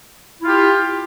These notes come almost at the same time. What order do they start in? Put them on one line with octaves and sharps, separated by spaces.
E4 F4 G4